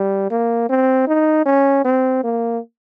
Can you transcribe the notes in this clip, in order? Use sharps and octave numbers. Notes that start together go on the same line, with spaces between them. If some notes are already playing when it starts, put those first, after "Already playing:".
Already playing: G3
A#3
C4
D#4
C#4
C4
A#3